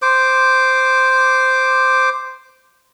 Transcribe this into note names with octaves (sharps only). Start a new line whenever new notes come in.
C5 D6